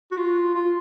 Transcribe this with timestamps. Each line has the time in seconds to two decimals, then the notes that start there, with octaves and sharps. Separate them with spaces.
0.12 F#4
0.17 F4
0.55 F4